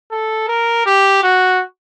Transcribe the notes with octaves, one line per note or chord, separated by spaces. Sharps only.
A4
A#4
G4
F#4